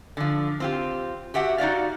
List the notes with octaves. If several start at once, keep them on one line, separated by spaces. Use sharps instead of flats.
D3 F3
C4 F4 G4
F#4 G4 E5 F#5
D#4 F#4 D5 F5